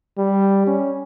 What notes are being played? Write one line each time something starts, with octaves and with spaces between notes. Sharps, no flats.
G3
C#4